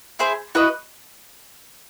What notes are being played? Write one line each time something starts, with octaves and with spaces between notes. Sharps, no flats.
E4 G#4 C5
E4 F#4 B4 D#5